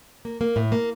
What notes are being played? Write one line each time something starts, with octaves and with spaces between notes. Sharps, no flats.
A#3
A#3
A2
A#3